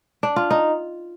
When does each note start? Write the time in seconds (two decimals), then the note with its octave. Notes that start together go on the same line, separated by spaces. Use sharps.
0.23 D4
0.36 F4
0.51 D#4